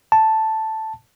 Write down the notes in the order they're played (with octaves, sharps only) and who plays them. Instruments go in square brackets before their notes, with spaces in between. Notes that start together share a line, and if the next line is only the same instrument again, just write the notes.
[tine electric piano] A5